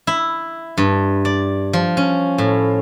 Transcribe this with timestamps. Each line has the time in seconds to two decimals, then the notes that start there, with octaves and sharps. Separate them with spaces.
0.07 E4
0.78 G2
1.25 D5
1.73 F3
1.97 C#4
2.38 A2